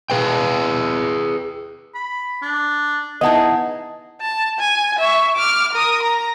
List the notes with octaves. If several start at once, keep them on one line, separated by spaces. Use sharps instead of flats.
G#4 B4 G5
B5
D4
B3 D#4 E4 G#4 D#5 F#5 A5
A5
G#5
E5 C#6
D6 F6
A#4 D#6
A#5